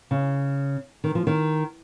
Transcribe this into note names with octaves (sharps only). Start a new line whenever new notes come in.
C#3
D#3
F3
D#3